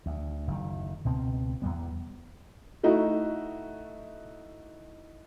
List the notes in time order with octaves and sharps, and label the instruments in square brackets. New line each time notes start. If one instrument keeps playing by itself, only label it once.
[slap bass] D2
F#1 D#3
C#2 B2 C4
E2 G3 B3
[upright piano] A3 D#4 E4 F#4